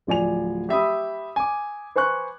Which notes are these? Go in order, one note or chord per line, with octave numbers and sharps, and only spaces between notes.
D1 F3 D5 G#5 F7
G4 E5 B5 D#6
G#5 D6
B4 C5 G#5 C#6 F#6